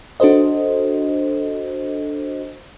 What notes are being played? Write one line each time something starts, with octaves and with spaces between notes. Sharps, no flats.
D4 F#4 A4 C5 D#5